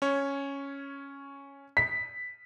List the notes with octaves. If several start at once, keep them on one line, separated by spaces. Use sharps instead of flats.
C#4 C#5
B6